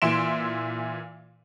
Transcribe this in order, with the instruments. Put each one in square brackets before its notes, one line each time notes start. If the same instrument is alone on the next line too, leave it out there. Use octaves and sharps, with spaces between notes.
[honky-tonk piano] A#2 E3 E5 C6 D7 E7